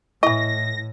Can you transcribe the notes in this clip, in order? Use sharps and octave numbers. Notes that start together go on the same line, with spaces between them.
A2 E3 E4 D#5 A#6